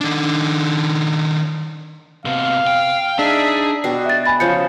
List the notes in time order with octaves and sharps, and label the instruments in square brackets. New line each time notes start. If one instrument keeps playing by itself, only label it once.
[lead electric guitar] D#3 D4
[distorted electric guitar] C3 B3 [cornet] F5
[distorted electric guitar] G5
[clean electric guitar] D4 [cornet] D#4 [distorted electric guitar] G#4 [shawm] E5
[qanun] B2 G3 [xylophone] C7
[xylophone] E5 A6
G#5 B5 A6
[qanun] C#3 F3 G#4 [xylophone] G6 C#7